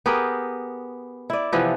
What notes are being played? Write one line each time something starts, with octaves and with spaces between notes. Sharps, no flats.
B3 G4 G#4 A#4
E4 D5
C3 E3 F3 B3